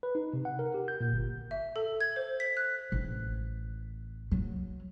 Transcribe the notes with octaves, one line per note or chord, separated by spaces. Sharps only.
B4
D#4
C3
F#5
A#4
G4
G6
A#2
G1
E5
A4
G#6
C5
B6
F#6
A1
F#3